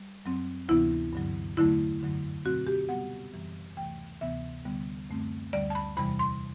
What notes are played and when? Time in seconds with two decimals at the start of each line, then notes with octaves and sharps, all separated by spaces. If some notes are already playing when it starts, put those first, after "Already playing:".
Already playing: G3
0.25 F#2 F#3 C4
0.69 D2 C3 E3 B3 E4
1.13 G2 D3 F#3
1.57 E2 D3 F#3 A3 E4
2.01 F#2 D3 F#3
2.45 B2 F#3 A3 C4 F#4
2.67 G4
2.89 C3 G3 B3 F#5
3.33 F#2 E3 G3
3.77 D2 C3 E3 A3 G5
4.21 D2 C3 E3 B3 E5
4.65 D2 D3 G3 B3
5.10 F#2 D3 A3 C4
5.53 D2 D3 G3 D5
5.70 A5
5.75 B5
5.97 E2 C3 E3 G3 B5
6.19 C6